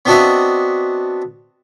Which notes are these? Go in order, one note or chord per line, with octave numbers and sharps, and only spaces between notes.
B3 C4 D4 F#4 D#5 E5